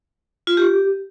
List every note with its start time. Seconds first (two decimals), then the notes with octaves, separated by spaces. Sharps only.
0.47 F4
0.57 G4